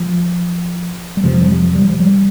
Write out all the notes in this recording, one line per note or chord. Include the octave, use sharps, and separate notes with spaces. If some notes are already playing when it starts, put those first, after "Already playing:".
Already playing: F3
G3
F2 C3 F3
G3
F3
G3
F3
G3